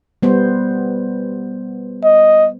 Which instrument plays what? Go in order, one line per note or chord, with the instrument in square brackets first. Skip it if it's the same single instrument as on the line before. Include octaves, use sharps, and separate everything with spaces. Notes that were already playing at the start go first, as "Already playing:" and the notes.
[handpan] G3 B3 C5
[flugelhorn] D#5